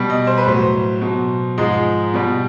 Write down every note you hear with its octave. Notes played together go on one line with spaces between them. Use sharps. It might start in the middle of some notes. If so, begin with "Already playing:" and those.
Already playing: B2 G3
D#5
C5
B4
A2 F#3 C5
B2 F#3
G#2 F3 G#3 D#5
B2 G3